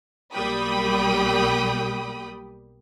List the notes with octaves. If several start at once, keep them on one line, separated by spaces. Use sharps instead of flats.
B1 G3 A#3 G5 B5 D#6